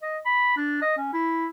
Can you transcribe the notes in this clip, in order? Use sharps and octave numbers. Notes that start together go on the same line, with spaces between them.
D#5
B5
D4
D#5
C#4
E4